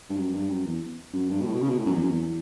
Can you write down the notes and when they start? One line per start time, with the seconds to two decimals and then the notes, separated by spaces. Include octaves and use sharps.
0.10 G2
0.17 F#2
0.33 G2
0.49 F#2
0.65 E2
1.13 F#2
1.30 G2
1.41 B2
1.46 A2
1.53 B2
1.61 C#3
1.69 B2
1.78 A2
1.86 F#2
1.93 E2
2.02 F#2
2.09 E2